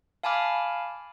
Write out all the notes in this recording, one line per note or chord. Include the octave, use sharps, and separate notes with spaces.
F5 G#5 A5 B5 D6 F6